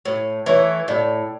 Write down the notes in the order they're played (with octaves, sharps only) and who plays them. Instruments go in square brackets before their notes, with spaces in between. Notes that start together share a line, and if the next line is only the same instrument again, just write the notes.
[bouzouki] A2
[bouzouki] E3 A3 [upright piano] C#5
[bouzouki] A2 [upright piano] D5